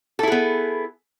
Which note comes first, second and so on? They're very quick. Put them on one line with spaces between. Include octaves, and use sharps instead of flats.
A4 E4 G#4 B3